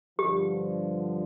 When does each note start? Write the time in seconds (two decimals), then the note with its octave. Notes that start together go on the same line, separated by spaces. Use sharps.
0.19 G2 D3 F3 G4